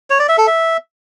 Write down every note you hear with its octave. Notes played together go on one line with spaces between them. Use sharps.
C#5
D5
E5
A4
E5